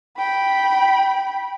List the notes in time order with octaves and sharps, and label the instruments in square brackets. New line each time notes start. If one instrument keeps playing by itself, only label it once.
[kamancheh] G5 B5